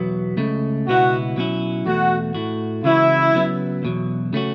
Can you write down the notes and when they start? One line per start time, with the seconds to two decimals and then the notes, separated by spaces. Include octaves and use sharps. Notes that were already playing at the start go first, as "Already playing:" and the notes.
Already playing: E2 B2 F#3 B3
0.37 C#2 C#3 A3
0.87 C#2 B2 B3 E4 F#4
1.36 B2 F#3 C#4 E4
1.85 E2 B2 A3 F#4
2.35 A2 A3 F#4
2.84 C#2 C#3 E3 C#4 E4 F#4
3.34 C#3 F#3 B3
3.83 E2 B2 F#3
4.33 C#3 A3 C#4 F#4